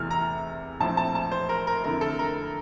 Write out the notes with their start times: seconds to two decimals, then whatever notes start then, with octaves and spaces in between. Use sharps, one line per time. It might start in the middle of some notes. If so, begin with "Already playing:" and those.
Already playing: E2 C3 E3 A3 F6
0.11 A#5
0.80 A#1 A2 F3 C4 A5
0.97 A5
1.15 A5
1.32 C5
1.49 A#4
1.67 A#4
1.84 F2 D3 A3 E4 A#4
2.01 A4
2.19 A#4